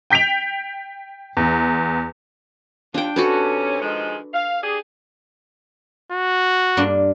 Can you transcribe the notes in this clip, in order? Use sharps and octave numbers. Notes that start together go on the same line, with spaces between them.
G5 G6 B6 D7 F7
E2
D#2 D4 F4 G5
C3 C#4 F#4 A4 B4
D#3 F3 G#3
F5
D4 G4 G#4
F#4
G2 A#3 D4